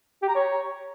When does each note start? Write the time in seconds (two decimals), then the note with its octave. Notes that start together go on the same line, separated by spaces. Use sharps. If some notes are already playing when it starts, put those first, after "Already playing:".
0.22 G4
0.29 A#5
0.35 C#5